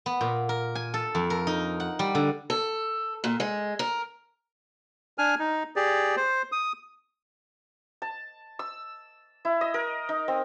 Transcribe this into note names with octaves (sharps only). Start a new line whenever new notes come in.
B3
A#2
A#4
G#5
A4
F2
A#4
D#4
F#5
G3
D3
A4
A#2
G#3
A#4
D4 G#5 F6
D#4
G4 G#4 D5
C5
D#6
A5
E6
E4
D#5
A#4
D#4
C4